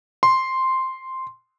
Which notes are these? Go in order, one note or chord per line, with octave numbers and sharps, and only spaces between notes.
C6